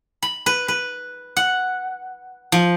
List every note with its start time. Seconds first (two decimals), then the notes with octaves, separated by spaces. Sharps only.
0.23 B5
0.46 B4
0.68 B4
1.36 F#5
2.52 F3